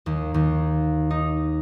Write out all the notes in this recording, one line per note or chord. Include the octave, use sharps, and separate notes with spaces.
D#2
D#2
D#4